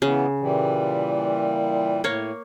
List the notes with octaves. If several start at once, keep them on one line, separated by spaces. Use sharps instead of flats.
C#3 E3 B3
A#2 E3 G3
A2 A#3 C#5